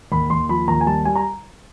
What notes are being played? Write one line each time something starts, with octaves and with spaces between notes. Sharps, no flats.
D#2 B5
D#2 C6
F3 B5
D#2 A#5
G#5
G3 A5
G3 G#5
A#5